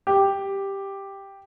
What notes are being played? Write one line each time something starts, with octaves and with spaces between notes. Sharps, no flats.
G4